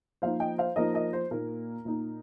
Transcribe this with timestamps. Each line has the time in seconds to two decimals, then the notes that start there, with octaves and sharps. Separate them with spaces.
0.22 F3 A#3 D#4 C5 F5
0.40 D#5 G5
0.58 C5 F5
0.76 F3 A#3 D#4 A#4 D#5
0.94 A#4 D#5
1.13 C5
1.31 A#2 A#3 D#4 A#4
1.85 A#2 A#3 D#4